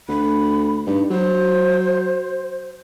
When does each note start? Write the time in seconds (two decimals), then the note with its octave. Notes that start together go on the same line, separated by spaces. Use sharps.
0.09 D2 B5
0.87 G2 D#4
1.10 F#3 C5